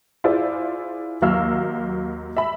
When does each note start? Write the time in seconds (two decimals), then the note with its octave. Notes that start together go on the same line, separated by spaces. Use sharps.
0.24 E4 F4 G#4 C5 D5
1.22 D#2 F#3 F5 E6 F6
2.37 E5 B5